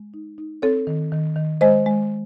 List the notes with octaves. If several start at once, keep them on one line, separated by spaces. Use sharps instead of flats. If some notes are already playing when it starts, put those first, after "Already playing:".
Already playing: G#3
D#4
D#4
C4 A4 C#5
D#3
D#3
D#3
G#3 C5 D#5
G#3